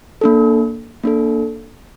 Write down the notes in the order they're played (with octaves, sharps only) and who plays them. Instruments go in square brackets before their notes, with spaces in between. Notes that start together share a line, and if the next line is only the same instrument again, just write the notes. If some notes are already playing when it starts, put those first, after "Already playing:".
[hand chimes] A#3 D4 A4
A#3 D4 A4